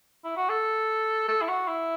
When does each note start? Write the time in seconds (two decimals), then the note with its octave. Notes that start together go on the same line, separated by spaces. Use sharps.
0.24 E4
0.37 F#4
0.49 A4
1.28 A4
1.41 E4
1.49 F#4
1.68 E4